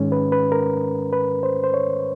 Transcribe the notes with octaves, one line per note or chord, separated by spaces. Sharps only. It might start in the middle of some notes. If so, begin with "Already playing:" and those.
Already playing: G#2 D#3 G#3 C#4
B4
B4
A#4
B4
C5
C5
C#5